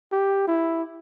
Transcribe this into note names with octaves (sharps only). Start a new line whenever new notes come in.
G4
E4